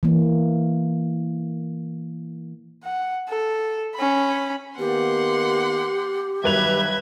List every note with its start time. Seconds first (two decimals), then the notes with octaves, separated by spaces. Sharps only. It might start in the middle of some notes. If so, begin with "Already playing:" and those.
0.03 E3 A#3
2.84 F#5
3.29 A4
3.95 C#4 B5
4.79 D#3 A#3 B3 G4 F#5 C6
6.44 G1 D#3 F#3 B4 E5 G#6 F7